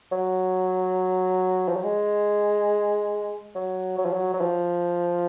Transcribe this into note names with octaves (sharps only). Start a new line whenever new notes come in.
F#3
F3
F#3
G#3
F#3
F#3
F3
F#3
F#3
F3